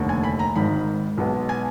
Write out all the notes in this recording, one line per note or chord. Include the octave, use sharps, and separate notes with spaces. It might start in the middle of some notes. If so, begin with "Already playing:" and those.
Already playing: F1 D#2 D3
G#5
B5
A#5
G#1 G#2 D#3 G#3 B5
B1 B2 G#3 B3
G#5